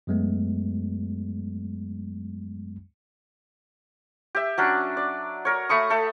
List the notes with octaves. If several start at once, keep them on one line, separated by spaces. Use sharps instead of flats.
F#2 F#3 G#3 A3 B3
G4 E5
F#3 C#4 D4
D5
A#4 C#5
A3 B5 C#6 D#6
A3 A4